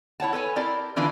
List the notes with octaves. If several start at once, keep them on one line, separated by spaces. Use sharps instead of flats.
E4 C#5 F#5 A5
A4 B4 C#5 G#5
C4 E4 G4 A#4 D5 A5
D3 E3 D4 F4 A4 B4